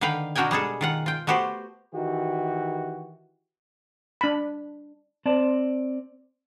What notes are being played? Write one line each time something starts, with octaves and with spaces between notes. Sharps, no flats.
D3 D#3 B4 F5 G5
B2 D4 F#4 A#4 G5 G#5
G3 G#3 G#4 A4
D#3 F4 F#5
F4 G5
A3 B3 F#4 G4 C5
D#3 E3 F#4 G4
D4 B5
C4 D5 A5